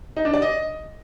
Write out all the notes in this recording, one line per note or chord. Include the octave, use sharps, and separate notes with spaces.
D#4
D4
D5
D#5